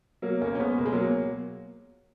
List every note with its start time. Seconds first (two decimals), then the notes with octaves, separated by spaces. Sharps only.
0.22 B2 F#3 A#3
0.41 C#2 A#3 C#4
0.55 C#4
0.59 B2 G#3 B3
0.78 C#2 A#3
0.86 G#3
0.92 B2 F#3 A#3